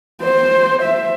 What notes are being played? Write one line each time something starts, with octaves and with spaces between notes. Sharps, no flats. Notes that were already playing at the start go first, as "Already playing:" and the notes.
C5
E5